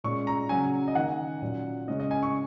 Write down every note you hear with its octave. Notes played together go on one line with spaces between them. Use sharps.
A#2 G#3 C#4 C#6
A#5
C#3 F#3 C#4 G#5
D#5
D#3 A#3 C#4 F#5
A#2 F#3 C#4
C#3 G#3 C#4 D#5
D#5
G#5
C#6